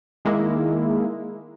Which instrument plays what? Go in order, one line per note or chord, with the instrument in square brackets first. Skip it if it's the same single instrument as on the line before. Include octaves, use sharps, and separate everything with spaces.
[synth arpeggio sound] D#3 G#3 A#3 E4